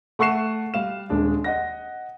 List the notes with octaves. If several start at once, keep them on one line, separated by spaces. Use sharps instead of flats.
A3 F#5 C#6 F#6 C7 E7
G3 F5 E7
D#1 G#3 D4 G#4
D#5 F#5 A#6